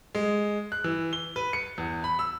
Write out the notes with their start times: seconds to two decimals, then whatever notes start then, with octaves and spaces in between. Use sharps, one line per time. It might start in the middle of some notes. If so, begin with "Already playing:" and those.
0.15 G#3
0.72 F#6
0.84 E3
1.13 G7
1.36 B4
1.53 C#7
1.78 E2
2.04 B5
2.19 E6